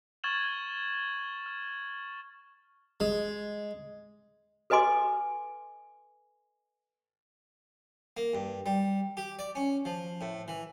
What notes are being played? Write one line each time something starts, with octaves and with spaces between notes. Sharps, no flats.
C#6 F6 G#6 A6 E7 F#7
F6
G#3
A4 B4 D#5 G#5 C6 D6
A#3
G2
G3
G4
D5
C#4
F3
A2
E3